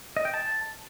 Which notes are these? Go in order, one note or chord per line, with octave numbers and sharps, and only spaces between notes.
D#5
G5
A5